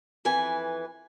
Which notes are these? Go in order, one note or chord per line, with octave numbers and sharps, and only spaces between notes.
F2 E3 B4 G#5